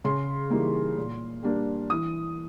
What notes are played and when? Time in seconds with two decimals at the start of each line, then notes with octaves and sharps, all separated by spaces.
0.04 C#3 C6
0.50 E3 G3 A#3 D#4
0.97 A#2
1.43 G3 A#3 D4
1.90 E3 D#6